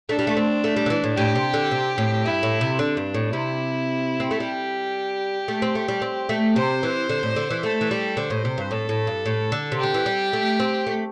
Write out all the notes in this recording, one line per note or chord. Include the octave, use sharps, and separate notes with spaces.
A3 D4
G3
A3
C4
A3
G3
D3
E3
A2
A2 G4
C3
D3
C3
A2
G2 E4
A2
C3
D3 D4
G2
A2
C3 E4
C4
A3
G3 G4
A3
C4
A3
G3
C4
A3
C3 C5
E3
D3
A2
D3
E3
A3 A4
E3
G3
D3 C5
A2
C3
G2
A2 A4
A2
G2
A2
D3
C3
D3 G4
E3
G3
A3
C4
A3